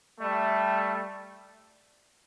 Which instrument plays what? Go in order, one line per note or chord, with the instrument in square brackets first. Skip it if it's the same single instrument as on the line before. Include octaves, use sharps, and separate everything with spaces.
[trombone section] G3 A3